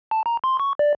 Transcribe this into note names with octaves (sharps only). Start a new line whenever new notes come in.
A5
A#5
C6
C#6
D5